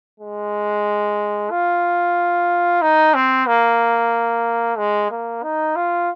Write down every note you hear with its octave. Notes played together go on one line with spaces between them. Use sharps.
G#3
F4
D#4
C4
A#3
G#3
A#3
D#4
F4